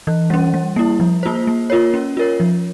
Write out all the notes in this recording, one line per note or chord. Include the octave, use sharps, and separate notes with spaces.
E3
G3 C#4
G3
A#3 E4
F3
A#3 F4 C5
A#3
F4 A#4 C#5
C#4
F4 A#4 C#5
F3